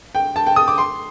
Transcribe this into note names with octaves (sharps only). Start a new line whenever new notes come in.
G5
A5
G5
D#6
D6
C6